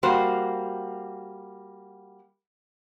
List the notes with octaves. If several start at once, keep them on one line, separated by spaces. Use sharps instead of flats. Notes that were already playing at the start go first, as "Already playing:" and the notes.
G3 A#3 F#4 C5